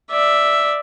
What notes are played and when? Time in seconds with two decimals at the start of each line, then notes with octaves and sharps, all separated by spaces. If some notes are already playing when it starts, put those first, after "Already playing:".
0.11 D5 E5